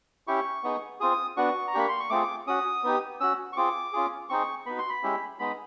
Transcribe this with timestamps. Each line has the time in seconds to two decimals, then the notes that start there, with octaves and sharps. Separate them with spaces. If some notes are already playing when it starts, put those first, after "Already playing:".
0.27 C#4 E4 G4 C#6
0.63 B3 D#4 G#4
1.00 C4 F4 G#4 D#6
1.37 B3 D4 F#4 C#6
1.68 A#5
1.74 A#3 D4 G4 B5
1.89 C6
2.00 C#6
2.10 A3 C4 F4 G#4 D6
2.47 C#4 F#4 D#6
2.83 B3 D#4 G4
3.20 C#4 F#4 E6
3.53 C#6
3.56 C4 F4 G#4 D6
3.93 C#4 F4 G#4
4.29 C4 D#4 G#4 C#6
4.66 B3 D#4 F#4 B5
4.78 C6
4.89 B5
5.03 G#3 C#4 E4 G4
5.39 G#3 B3 D#4 B5